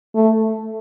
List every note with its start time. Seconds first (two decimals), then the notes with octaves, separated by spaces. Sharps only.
0.15 A3